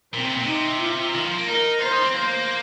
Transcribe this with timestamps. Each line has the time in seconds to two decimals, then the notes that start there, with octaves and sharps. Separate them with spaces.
0.13 A#2 C4
0.24 C3
0.36 A#2
0.46 C3 D#4
0.80 F4
1.14 D#3
1.25 F3
1.36 A#3
1.48 D#4 A#4
1.81 F4 C5
1.92 D#4
2.03 C4
2.15 A#3 C5